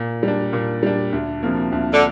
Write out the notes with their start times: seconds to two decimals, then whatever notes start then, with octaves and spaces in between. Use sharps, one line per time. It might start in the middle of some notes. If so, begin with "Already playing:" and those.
Already playing: A#2
0.23 G3 D4
0.53 A#2
0.83 G3 D4
1.12 D2
1.43 C3 F3 A#3
1.72 D2
1.93 D3